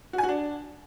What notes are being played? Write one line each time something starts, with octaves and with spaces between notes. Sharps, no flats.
F#4
G#5
F#4
D4